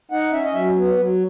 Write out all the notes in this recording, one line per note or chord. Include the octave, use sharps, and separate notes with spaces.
D#4 F#5
C#4 E5
D#5
F#3 E5
B3
F#3